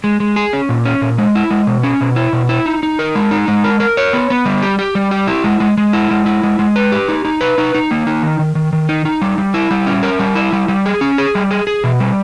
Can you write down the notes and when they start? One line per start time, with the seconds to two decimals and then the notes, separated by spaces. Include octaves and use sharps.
0.04 G#3
0.20 G#3
0.36 G#4
0.53 C#4
0.69 A#2
0.85 C#4
1.01 A#2
1.18 G#3
1.35 E4
1.51 G#3
1.67 B2
1.83 C#4
2.01 B2
2.16 E4
2.33 B2
2.49 E4
2.66 D#4
2.83 D#4
2.99 A#4
3.15 G#3
3.31 D#4
3.48 G#3
3.64 A#4
3.80 A#4
3.97 C#5
4.13 B3
4.30 B3
4.46 G3
4.62 G4
4.79 G4
4.95 G3
5.11 G4
5.27 E4
5.44 G#3
5.60 G#3
5.78 G#3
5.93 E4
6.11 G#3
6.26 E4
6.43 G#3
6.59 G#3
6.76 B4
6.92 G4
7.08 D#4
7.25 D#4
7.41 B4
7.58 D#4
7.75 D#4
7.91 A#3
8.07 D#4
8.23 D#3
8.39 D#3
8.55 D#3
8.73 D#3
8.89 D#4
9.05 D#4
9.22 G3
9.38 G3
9.54 E4
9.71 G3
9.87 C#4
10.03 A#4
10.19 G3
10.36 E4
10.53 G3
10.68 G3
10.86 G#4
11.01 C#4
11.18 G#4
11.35 G3
11.51 G#4
11.67 G#4
11.84 B2
12.00 G3